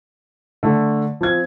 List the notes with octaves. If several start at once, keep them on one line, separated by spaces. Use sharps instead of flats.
D3 A3
F3 C4 G#6